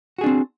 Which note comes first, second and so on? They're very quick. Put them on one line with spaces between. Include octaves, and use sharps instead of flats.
F#4 G#4 D4 C4